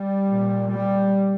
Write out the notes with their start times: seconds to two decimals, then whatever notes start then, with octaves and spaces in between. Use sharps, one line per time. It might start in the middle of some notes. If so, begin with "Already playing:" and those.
Already playing: G3
0.25 A#2
0.67 G3